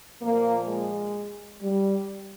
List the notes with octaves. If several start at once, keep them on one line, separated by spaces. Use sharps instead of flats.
A#2 F3 A#3
G#3
G3